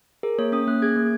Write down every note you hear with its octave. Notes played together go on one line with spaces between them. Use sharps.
G#4 A#4
A#3 C#5
C#4 D#6
A#3 F#6
G#4 G#6
A#3